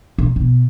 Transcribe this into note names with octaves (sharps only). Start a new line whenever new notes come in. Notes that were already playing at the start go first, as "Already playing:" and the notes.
A#2
B2